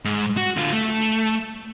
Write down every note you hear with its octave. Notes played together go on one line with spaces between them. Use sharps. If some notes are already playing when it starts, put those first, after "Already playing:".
G#2
F#4
D3 F4
A3